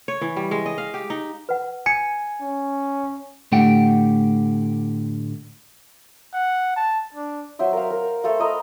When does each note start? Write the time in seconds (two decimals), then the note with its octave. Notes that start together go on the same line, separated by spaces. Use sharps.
0.08 C#5
0.21 E3
0.36 G3
0.51 G#3
0.66 D#5
0.78 F5
0.94 G4
1.10 D#4
1.49 B4 F#5
1.86 G#5 C#7
2.41 C#4
3.52 A2 D3 A3 G4 F#5 G5
6.34 F#5
6.76 A5
7.14 D4
7.59 F#3 C5 E5 C6
7.73 A#4 F5
7.90 A#4
8.24 A3 A4 C5 F5
8.39 A#4 D#5 A#5 B5